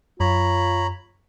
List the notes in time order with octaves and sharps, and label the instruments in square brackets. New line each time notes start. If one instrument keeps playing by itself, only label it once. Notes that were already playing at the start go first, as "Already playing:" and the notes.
[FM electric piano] F#2 [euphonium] F4 [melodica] C#5 A#5 B5